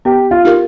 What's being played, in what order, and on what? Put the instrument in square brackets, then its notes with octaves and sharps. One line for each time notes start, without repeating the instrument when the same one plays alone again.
[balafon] B3 [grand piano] G4
[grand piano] F4
[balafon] D#4 G4 A#4